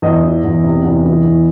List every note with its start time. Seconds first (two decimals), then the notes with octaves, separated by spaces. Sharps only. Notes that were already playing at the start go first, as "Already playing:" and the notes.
0.02 E2 D#5
0.23 E3
0.44 E2
0.64 C3
0.84 E2
1.04 E3
1.24 E2